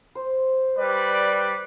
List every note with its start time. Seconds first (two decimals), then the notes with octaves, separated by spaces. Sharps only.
0.15 C5
0.76 G3 B4 D5